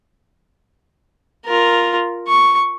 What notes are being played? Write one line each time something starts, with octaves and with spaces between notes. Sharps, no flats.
F4 A#4
C#6